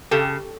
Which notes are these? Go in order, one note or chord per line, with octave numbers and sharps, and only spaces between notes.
C#3 G4 A4